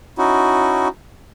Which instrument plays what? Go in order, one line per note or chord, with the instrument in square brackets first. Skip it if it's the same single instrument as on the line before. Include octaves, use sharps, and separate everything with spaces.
[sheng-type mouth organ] C#4 D#4 E4 F#4